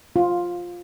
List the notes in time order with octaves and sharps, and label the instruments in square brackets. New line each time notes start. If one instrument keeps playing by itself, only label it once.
[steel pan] F4